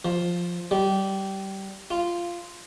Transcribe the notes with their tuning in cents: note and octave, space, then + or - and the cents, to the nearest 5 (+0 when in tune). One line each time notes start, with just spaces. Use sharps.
F3 +5
G3 -20
F4 -10